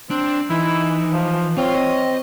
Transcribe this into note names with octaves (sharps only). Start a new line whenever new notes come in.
C4 D4
E3 D#4 E4
F3
C4 F4 C#5
D#5